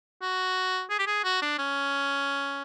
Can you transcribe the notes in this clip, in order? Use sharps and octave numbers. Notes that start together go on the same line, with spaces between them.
F#4
G#4
G4
G#4
F#4
D4
C#4